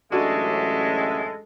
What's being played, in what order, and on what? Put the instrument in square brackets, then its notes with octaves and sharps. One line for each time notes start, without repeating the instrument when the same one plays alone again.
[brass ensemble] A1 F#2 E5 [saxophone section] G#3 [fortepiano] D4 F#4 [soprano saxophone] A4